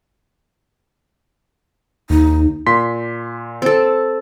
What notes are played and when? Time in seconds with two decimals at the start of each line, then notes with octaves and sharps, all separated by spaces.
2.10 D#2 D#4
2.67 A#2 C6 B6
3.62 C4 A4